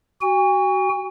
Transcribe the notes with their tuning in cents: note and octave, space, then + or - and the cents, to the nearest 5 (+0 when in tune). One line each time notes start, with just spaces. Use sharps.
F#4 +25 G#5 -40